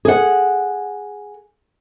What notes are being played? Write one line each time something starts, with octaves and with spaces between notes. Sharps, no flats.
G#4 F#5